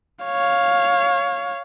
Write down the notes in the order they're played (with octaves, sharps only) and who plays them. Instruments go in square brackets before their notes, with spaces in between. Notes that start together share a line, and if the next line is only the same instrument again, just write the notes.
[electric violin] C#5 F5